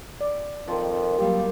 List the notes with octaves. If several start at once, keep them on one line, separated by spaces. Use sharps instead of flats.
D5
F2 D#3 F3
F#3 G3 A#3 G4